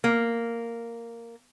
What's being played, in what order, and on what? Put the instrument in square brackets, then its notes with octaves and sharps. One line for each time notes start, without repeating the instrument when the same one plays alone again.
[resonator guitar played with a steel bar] A#3